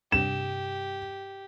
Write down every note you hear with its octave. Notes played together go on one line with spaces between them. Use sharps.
G2 C3 G4 E7